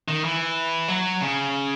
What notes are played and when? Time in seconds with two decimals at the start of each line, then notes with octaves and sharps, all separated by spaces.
0.08 D#3
0.24 E3
0.88 F#3
1.21 C#3